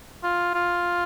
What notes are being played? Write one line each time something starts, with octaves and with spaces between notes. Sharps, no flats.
F4
F4